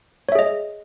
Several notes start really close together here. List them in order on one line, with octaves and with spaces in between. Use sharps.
C#5 E5 G#4 D#5